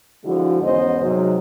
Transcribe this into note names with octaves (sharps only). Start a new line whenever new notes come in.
D3 F3 G#3 E4 F#4
E2 G#2 B3 C#4 C5 D#5
G#2 C3 F#3